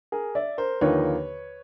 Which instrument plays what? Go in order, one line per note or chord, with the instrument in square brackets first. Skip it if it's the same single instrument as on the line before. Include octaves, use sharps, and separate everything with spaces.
[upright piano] G#4 A#4
D5 E5
A#4 C5
D#2 D3 F3 A#3 D#4 B4 C#5